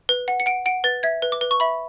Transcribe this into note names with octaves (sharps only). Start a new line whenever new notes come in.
B4
F#5
C#7
F#5 D7
F#5 D7
B4 A6
E5 G#6
B4
D6
B4
C#6
E5 B5